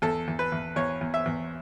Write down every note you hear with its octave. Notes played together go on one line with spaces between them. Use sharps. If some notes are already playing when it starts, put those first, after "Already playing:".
E2 A4
E2
B4
E2
E2 C#5
E2
E5
E2